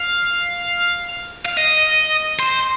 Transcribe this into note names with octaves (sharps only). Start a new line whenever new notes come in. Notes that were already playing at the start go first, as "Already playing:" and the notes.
Already playing: F5
F5
D#5
C5